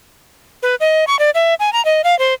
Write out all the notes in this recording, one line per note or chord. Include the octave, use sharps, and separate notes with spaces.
B4
D#5
C#6
D5
E5
G#5
A#5
D#5
F5
C5